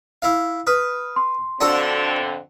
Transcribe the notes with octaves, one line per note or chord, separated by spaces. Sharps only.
E4 F5
B4 D#6 F6
C6
F2 D3 C4 D4 F#4 A4